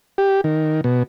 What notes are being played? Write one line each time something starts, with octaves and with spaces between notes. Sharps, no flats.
G4
D#3
B2